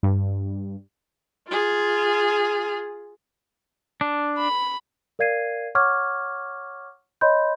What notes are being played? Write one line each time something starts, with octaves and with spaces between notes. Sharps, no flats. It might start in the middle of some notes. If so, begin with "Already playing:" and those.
G2
F4 G#4
D4
B5
A#4 D5 F5 G#6 C7 D#7
C#5 F#5 C#6 D6 F6 G#6
C#5 D#5 B5 C6 G6